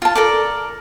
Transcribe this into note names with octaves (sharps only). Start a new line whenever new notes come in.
F4 A5
A4 A#4 D5